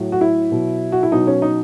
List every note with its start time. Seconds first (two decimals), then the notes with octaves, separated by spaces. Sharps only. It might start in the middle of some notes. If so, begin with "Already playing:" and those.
Already playing: A2 F#3
0.12 F#4
0.21 E4
0.52 B2 F#3
0.92 F#4
1.03 E4
1.11 B2 F#3 D#4
1.27 C#4
1.42 D#4